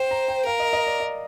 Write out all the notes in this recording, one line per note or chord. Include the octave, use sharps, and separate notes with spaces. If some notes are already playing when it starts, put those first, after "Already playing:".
Already playing: C5 G5
A#5
G5
A#4 F5
D#5
D#5
D5
D#5